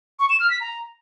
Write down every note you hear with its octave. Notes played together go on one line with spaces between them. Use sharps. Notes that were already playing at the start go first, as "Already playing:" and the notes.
C#6
E7
F6
B6
A#5